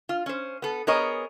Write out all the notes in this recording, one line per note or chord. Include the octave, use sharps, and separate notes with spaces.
F4
C#4 C5
B3 A4
B3 G#4 A#4 C#5 D#5